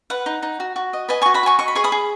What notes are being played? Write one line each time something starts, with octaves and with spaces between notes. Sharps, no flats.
B4 F#5
D#4
D#4
F#4
F#4
D#5
B4 D#5 G#5
F#4 G#5 C#6
F#5 B5
F#4 G#5 C#6
D#5 C#6
B5
G#4 G#5 C#6
B5 D#6
G#4